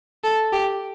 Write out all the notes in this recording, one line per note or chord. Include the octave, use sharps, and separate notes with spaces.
A4
G4